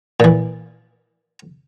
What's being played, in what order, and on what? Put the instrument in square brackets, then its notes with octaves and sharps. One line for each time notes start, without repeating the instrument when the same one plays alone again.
[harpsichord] A#2 E3